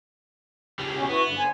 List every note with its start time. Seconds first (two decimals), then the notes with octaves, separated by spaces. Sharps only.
0.79 C#2 G3
0.95 B2 C#4
1.09 B3 E4 F#4 B4
1.25 G2 D3
1.38 D3 C5 G#5